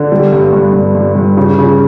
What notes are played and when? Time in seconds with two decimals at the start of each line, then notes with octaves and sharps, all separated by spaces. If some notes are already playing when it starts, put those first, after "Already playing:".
Already playing: D3
0.12 G3
0.33 G2
0.53 G2
0.73 G2
0.95 G2
1.15 G2
1.37 C#3
1.58 C#3